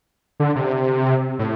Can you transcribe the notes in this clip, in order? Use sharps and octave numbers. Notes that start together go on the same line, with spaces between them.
D3
C3
A2